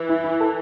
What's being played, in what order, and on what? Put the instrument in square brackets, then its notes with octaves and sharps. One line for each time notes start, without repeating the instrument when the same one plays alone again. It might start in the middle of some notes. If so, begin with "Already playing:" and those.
Already playing: [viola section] E3
[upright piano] E4
E4
A4